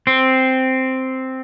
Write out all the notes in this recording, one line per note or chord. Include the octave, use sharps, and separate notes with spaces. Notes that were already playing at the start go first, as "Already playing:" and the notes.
C4